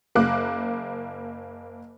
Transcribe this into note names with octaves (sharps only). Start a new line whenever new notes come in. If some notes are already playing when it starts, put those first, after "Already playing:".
F#1 A#3 D6 F#6